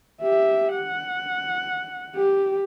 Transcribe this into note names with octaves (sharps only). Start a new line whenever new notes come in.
G4 E5
F#5
G4